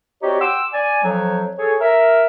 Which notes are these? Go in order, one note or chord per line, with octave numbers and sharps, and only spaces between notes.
C4 D#4 F#4 G4 C#5 D5
F#5 G5 C6 D6 E6
D5 G#5
F2 F3 F#3
G#4 A4 C#5
A#4 E5